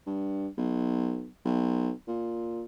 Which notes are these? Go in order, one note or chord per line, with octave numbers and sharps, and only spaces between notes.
G2
B1
B1
A#2